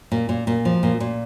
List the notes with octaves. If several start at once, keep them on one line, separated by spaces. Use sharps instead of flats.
A#2
A#2
A#2
F3
A#2
A#2